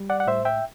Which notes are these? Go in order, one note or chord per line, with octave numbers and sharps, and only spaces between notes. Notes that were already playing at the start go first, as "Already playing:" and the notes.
Already playing: G3
D5 F#5
F#5
A2 C5 E5
E5 G5